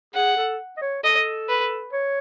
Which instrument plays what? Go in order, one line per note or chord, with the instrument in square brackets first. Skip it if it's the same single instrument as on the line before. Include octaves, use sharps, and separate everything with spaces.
[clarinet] G#4 [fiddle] F#5
[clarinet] A4
D#5
C#5
[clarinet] A4 [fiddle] D#5
[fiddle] B4
[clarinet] C#5